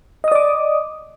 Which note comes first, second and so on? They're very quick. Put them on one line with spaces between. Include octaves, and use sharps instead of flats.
D#5 D#6 D5 D6